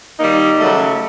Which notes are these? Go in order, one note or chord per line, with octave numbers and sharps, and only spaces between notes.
D#3 G3 A#3 D#4
C#3 F#3 A3